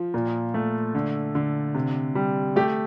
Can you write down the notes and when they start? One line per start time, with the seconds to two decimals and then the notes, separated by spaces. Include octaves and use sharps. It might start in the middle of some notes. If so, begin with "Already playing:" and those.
Already playing: F3
0.14 A#2
0.54 A3
0.95 D3
1.35 D3
1.75 C3
2.15 G3
2.56 A3 G4